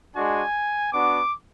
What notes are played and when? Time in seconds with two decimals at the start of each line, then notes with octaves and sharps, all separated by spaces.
0.16 G#3 D4 F#4 G#5
0.93 B3 D4 F#4 D6